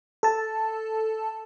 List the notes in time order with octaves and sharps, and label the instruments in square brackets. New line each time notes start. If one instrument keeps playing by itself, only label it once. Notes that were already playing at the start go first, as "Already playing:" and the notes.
[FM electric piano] A4 A5